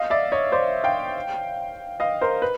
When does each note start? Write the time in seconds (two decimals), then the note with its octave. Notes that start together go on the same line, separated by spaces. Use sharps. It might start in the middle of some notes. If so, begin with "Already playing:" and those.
Already playing: D#5 F5
0.10 D5 E5
0.32 C#5 D#5
0.52 C5 D5
0.84 F5 G5
2.00 D#5 F5
2.21 A#4 C5
2.42 B4